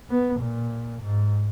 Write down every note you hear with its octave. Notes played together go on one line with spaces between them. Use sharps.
B3
A#2
G#2